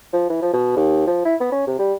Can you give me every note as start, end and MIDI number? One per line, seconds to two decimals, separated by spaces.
0.13 0.28 53
0.30 0.42 52
0.42 0.53 53
0.53 0.72 47
0.77 1.06 39
1.07 1.24 53
1.25 1.35 64
1.41 1.48 59
1.52 1.65 61
1.67 1.78 48
1.79 1.94 55